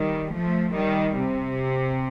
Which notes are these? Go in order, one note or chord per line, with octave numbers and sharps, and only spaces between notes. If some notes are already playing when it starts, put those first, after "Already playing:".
Already playing: D#3 G3
F3 A3
D#3 G3
C3